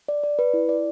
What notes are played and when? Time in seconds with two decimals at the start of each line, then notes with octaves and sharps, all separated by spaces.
0.09 D5
0.23 D5
0.39 B4
0.54 E4
0.69 D5